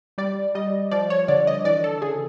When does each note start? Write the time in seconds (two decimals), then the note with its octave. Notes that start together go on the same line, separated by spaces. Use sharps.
0.18 G3 D5
0.55 G3 D#5
0.91 F3 D5
1.10 C#5
1.28 D3 D5
1.47 D#5
1.65 E3 D5
1.84 A4
2.02 C#3 G#4